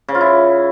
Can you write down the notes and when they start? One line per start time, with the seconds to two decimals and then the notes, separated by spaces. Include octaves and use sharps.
0.08 C#3
0.15 F4
0.21 E4